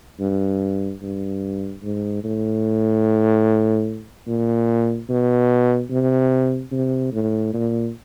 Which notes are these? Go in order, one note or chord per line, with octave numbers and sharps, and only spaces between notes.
G2
G2
G#2
A2
A#2
B2
C3
C3
A2
A#2